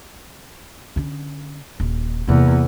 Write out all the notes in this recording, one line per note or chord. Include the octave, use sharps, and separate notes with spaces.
D3 C#4
D#1
E2 C3 A#3